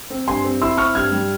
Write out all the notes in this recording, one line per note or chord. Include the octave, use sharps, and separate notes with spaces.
C4
G2 G#5 C6
C4
E4 C6 E6
C4 C#6 F6
G2 F6 G#6
G3